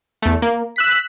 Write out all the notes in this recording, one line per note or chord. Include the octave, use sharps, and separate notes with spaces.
E2 A3
A#3
E6 F#6 B6